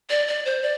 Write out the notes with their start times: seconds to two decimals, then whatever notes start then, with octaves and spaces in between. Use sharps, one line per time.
0.10 D5
0.28 D5
0.45 C5
0.62 D5